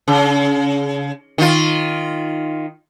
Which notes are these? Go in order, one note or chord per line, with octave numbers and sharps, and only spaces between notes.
C#3
D#3 F4